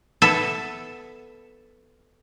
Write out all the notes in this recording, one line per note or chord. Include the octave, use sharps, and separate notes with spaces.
B3 A4 E5